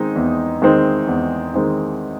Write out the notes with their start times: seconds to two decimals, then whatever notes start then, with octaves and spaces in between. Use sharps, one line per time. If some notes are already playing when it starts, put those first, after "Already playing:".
Already playing: D#3 G#3 C4 D#4
0.16 E2
0.62 D#3 G#3 C4 D#4
1.08 E2
1.54 D#3 G#3 C4 D#4